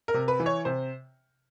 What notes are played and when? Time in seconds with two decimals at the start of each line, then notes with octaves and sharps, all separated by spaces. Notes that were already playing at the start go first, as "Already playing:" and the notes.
0.08 A#4
0.14 C3
0.28 B4
0.40 E3
0.46 C#5
0.65 C3 C5